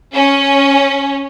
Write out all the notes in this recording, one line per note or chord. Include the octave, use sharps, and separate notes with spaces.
C#4